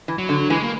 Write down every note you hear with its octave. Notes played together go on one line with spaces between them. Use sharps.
E3
F#3
D3
E3 G#3
A#3